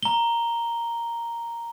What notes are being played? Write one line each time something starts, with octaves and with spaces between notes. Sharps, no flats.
A#5 G7